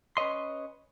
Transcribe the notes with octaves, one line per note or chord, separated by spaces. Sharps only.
C#4 B4 C#5 D#5 C6